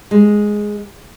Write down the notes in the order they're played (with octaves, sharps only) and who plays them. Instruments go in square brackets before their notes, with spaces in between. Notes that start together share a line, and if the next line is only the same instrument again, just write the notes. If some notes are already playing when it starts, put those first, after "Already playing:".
[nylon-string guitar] G#3